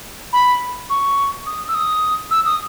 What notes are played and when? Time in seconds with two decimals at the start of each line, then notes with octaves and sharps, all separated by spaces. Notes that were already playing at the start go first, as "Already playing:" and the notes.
0.33 B5
0.90 C#6
1.46 D#6
1.68 E6
1.75 D#6
2.31 E6
2.46 D#6